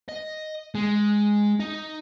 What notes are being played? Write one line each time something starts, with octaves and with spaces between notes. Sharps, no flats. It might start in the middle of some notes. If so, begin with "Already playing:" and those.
D#5
G#3
D#4